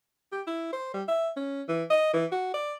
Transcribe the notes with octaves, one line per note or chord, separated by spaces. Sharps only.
G4
E4
C5
G3
E5
C#4
E3
D#5
E3
F#4
D5